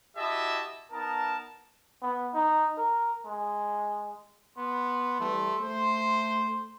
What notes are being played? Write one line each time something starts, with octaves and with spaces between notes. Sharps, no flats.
E4 F#4 G4 D#5 E5 A5
B3 D#4 A#4 A5
B3
D#4
A#4
G#3
B3 C6
E3 G3 A3 B4
A3 C5